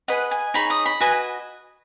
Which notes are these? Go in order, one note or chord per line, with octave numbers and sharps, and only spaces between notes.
G#4 B4 D#5 F#5
G#5
D#4 G#4 C#5 B5
D#6
B5
F#4 B4 D#5 G#5